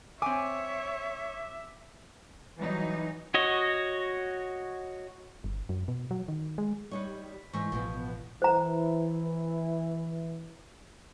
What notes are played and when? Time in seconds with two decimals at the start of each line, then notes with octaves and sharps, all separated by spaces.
0.22 C4 C#5 E5 G#5 D6
2.58 E3 F#3 G3 D#4
3.34 F#4 C#5 D#5
5.44 G1
5.69 F#2
5.88 B2
6.11 F#3
6.28 D#3
6.58 G#3
6.91 G3 D#4 B4 C#5 C#6
7.53 G#2 E3 C#6 E6
7.72 A1 B2 F3 B3
8.42 E3 E4 C5 A#5